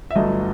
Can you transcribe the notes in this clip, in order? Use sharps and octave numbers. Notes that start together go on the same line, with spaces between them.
E5
G1 G2 F#3 A3 D#5